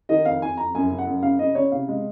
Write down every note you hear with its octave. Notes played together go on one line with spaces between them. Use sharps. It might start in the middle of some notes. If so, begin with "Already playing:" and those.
D#3 D#5
F2 F5
F2 G#5
F2 A#5
F#2 G#5
C#3
F#5
F#2
C#3 F5
C#3 D#5
C#3 C#5
C3 F5
G#3